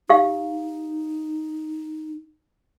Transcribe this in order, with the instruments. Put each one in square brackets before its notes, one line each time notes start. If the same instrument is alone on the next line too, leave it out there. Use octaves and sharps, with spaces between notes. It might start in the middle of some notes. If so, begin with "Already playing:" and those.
[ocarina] D#4 [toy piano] G4 F5